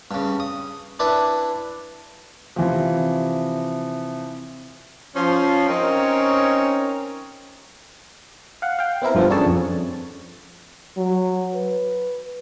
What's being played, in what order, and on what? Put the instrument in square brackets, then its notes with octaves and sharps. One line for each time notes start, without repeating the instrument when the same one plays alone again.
[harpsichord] G2 C#3
D#6
D4 E4 B4
[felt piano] C3 E3 F3
[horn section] F3 C#4 C6
C4 C#4 D#4 A#4 C#5
[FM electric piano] F5 F#5
F5 G5
B3 C4 E4 A#4
G2 F3 B3 C4
C#4 D4 G#4 A4 C#5 A5
F2
[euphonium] F#3
B4